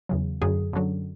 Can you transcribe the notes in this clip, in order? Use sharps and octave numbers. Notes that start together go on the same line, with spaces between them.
E2 C#3 F#3
F#2 D3 F#3 G#4
F#2 D3 F#3